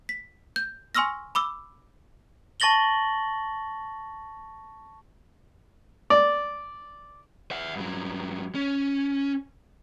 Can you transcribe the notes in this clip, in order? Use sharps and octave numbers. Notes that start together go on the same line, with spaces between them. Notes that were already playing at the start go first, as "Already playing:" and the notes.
B6
G6
G#5 C6 C#6 E6 F6 A#6
B5 D6 E6
A5 C#6 A6 A#6 F#7 G7
D5
E5 F#5
G2 F#3
C#4